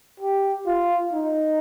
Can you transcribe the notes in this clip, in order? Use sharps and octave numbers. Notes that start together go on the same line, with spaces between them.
G4
F4
D#4